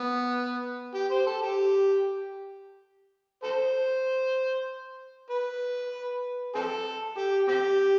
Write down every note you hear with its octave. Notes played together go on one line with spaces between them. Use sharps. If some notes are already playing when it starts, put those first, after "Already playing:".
Already playing: B3
G4
C5
A4
G4
A4 C5
B4
C4 A4
G4
C4 G4